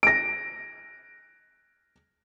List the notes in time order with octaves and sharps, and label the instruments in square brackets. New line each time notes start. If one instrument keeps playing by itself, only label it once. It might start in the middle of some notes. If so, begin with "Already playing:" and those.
[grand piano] A#6 D7